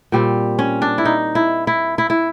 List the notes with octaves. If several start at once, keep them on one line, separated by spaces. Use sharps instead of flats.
A#2 G3 C4
C#4
D4
E4
D#4
E4
E4
E4
E4